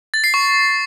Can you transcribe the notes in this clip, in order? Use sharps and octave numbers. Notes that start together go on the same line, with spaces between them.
A6
C7
C#6